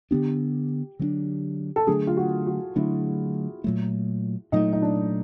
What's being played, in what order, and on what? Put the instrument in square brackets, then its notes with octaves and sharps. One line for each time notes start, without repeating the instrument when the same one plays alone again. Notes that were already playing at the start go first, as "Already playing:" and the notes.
[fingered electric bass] D3 F#3 B3 D4 [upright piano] G4
[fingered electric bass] D3 F#3 B3 D4
[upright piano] A4
[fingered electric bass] D3 F#3 A3 D4 [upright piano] G#4
[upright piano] F4
F#4
F#4
[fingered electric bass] D3 F#3 A3 D4 [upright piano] E4
[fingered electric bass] A#2 F#3 A3
[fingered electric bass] A#2 F#3 A3 [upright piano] D#4
[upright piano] D#4
D4